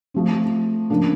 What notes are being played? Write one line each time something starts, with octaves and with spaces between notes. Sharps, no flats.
F3 A3 C4
C#3 F3 A#3 D4